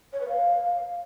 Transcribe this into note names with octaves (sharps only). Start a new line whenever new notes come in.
C#5
B4
F5